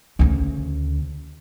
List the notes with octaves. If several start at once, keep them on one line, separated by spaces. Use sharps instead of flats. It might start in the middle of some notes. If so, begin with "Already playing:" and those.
D2 C#3